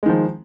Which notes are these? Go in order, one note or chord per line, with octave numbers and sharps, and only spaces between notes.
D#3 F3 G#3